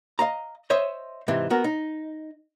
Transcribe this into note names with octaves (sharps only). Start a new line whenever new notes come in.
D#5 F5 A#5
C5 C#5 D#5 E5 C6
G#2 C3 E3 C4
B3 F#4 A#4
D#4